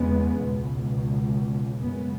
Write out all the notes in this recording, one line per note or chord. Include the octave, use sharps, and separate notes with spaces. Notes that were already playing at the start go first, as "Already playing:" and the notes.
Already playing: E2 C#3 G#3 B3
C#2 B2
F#2 C#3 G#3 B3